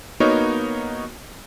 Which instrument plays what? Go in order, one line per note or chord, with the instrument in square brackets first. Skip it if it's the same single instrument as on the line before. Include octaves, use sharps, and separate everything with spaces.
[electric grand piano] A#3 B3 D#4 F#4 A#4 C#5